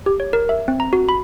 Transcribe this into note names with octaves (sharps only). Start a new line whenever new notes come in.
G4
C#5
A#4
E5
C4
A#5
F#4
B5